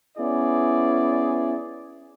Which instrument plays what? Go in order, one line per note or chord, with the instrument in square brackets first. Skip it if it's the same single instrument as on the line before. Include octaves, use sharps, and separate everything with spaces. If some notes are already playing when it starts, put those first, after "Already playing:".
[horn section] B3 C#4 E4 G#4 D5